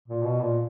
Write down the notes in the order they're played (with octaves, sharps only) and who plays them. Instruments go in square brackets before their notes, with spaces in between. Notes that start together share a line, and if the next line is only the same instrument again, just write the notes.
[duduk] A#2
B2
A#2